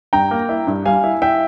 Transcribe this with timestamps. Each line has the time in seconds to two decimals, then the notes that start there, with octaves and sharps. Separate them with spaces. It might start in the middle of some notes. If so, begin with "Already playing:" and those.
0.13 G2 G5 A#5
0.31 A#3
0.49 E4
0.67 G2
0.86 G3 F5 G#5
1.03 E4
1.22 E4 E5 G5